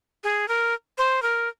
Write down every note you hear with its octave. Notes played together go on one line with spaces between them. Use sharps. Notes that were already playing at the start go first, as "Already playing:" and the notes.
G#4
A#4
C5
A#4